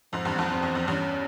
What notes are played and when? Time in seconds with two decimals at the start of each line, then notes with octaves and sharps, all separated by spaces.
0.13 F2 G#2 C4
0.25 E2 G2
0.38 F2 G#2
0.50 F2 C4
0.63 E2
0.75 F2
0.88 E2 G2 C#4